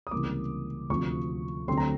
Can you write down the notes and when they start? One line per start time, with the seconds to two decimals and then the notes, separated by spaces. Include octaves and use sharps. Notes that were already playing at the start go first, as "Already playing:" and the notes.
0.07 D#6
0.11 C#2 C3 E3 G3 A#3 D6
0.90 D2 C3 F3 C#6
1.68 D2 D3 F#3 A3 C4 C6
1.77 A#5